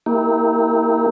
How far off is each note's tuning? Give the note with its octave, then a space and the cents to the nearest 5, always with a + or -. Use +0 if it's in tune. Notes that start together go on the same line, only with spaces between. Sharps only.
A#3 -15 E4 -30 G4 +0